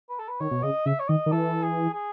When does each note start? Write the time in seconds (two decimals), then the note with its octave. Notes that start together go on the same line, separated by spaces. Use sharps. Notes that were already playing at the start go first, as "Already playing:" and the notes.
0.09 B4
0.19 A4
0.28 B4
0.40 D#3 C#5
0.51 B2
0.63 C#3 D#5
0.86 C#3 E5
0.99 C#5
1.08 D#3 D#5
1.26 D#3
1.32 E3 A4
1.63 G#4
1.93 G#4